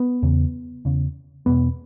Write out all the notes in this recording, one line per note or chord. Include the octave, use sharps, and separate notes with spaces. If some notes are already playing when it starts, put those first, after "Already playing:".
Already playing: B3
E2 C#3
E2 C#3
E2 B2 B3